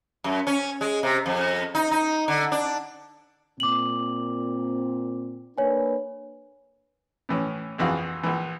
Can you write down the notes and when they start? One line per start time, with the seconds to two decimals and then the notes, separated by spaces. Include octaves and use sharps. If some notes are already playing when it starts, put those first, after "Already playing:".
0.24 F#2
0.47 C#4
0.81 G#3
1.03 C3
1.26 F2
1.75 D#4
1.91 D#4
2.28 D3
2.52 D4
3.60 A#2 C4 D6 F#7
5.58 A#3 D4 B4 C#5 G#5
7.29 A2 E3 C#4
7.78 A#1 F2 E3 F#4 G#4 F5
8.23 A#1 E3